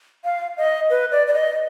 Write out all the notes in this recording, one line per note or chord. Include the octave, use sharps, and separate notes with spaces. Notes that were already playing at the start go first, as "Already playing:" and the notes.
F5
D#5
B4
D5
D5
D#5